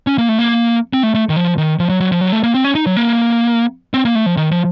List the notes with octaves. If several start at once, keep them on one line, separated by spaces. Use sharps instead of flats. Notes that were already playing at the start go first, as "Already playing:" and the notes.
C#4
A#3
A3
A#3
C4
A3
A3
D#3
F3
D#3
F3
F#3
F#3
F3
F#3
A3
A#3
C4
C#4
D#4
F#3
A#3
C4
A#3
A3
F3
D#3
F3